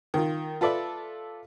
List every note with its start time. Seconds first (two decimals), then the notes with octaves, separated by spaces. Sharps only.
0.14 D#3 F4
0.61 F4 A4 B4 D5 E5